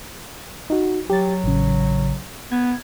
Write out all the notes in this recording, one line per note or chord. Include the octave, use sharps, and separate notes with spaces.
D#4 F#4
F#3 G4 A6
A1 C#3
B3 G#6